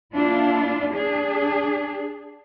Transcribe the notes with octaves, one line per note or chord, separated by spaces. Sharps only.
A#3 D4 E4 F4
D4 G#4